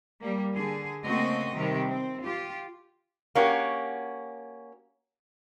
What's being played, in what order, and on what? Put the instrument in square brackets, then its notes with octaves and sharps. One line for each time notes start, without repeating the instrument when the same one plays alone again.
[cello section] G3 A#3
D3 G#4
C#3 A3 A#3 C4 F#4 D#5
C3 D#3 G3 G4
C4
F4 G4
[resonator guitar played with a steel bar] A#3 C#4 F#4 G4